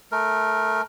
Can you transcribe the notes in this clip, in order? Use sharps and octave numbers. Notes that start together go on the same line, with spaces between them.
A3 A#4